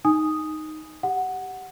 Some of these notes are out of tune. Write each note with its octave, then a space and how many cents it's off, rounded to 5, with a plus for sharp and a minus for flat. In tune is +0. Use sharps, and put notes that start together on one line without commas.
D#4 +0 G#5 +0 D#6 +0
G4 +0 F#5 +0